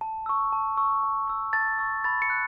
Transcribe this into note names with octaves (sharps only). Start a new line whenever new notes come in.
A5
C#6 E6
A5
C#6 E6
A5
C#6 E6
A5 A6
C#6 E6
B5 A6
C#7
F#6